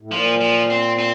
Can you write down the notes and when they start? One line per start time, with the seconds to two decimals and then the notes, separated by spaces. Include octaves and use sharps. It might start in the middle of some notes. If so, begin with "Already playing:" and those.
0.01 A2
0.11 A#2 F3
0.41 F3
0.70 C4
0.99 C4